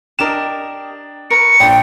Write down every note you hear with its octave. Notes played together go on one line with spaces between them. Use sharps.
D4 G4 A#4 D#5 E7
A#4 B4 C#6 C#7
A#1 D4 G5